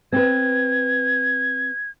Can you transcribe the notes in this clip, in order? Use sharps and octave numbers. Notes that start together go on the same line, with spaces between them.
C4 B4 G#6